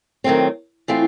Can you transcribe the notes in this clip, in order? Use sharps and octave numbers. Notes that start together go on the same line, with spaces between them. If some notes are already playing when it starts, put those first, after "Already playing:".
D#3 F#3 A3 C4
E3 A3 C4 F4